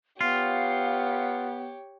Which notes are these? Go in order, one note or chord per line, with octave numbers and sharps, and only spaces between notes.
B3 F4 G4 C#5 F5